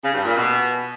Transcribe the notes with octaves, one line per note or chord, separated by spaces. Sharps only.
C#3
G2
A#2
B2